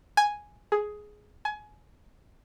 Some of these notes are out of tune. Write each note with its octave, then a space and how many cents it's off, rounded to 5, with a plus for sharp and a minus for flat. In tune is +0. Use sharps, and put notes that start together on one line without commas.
G#5 +0
G#4 +10
G#5 +25